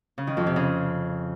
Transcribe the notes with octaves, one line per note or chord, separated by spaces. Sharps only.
C#3
D#3
F2
C3
C#3